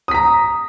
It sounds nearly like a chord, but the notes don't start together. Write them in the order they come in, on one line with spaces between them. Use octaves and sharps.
D#6 B6 A#5